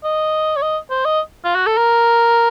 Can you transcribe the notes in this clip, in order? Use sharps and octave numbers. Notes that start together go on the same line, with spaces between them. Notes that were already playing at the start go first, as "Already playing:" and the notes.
D#5
C#5
D#5
C5
D#5
F4
F#4
A4
A#4